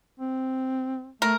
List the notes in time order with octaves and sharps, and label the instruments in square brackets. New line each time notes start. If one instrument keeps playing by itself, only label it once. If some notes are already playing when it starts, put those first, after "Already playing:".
[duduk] C4
[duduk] A3 [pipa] A#4